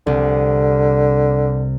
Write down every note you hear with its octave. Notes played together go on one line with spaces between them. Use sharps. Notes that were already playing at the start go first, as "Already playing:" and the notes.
C2 D3